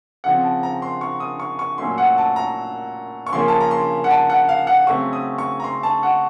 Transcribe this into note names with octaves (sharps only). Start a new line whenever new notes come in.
C#3 F3 C4 F#5
A5
A#5
C6
C#6
D#6
C#6
C#6
A#2 F#3 A3 C#4 C6
F#5
A5
A#5
C#6
C#3 F3 A#3 C#4 C6
A5
A#5
C6
F#5
A5
F#5
F5
F#5
C#3 F#3 A3 C4 C#6
D#6
C#6
A#5
C6
A5
F#5